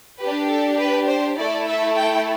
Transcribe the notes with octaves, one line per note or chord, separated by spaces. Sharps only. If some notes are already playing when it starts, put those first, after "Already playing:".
D4 G4 B4
A4
B4
C5
A3 E4 A4 D5
E5
G5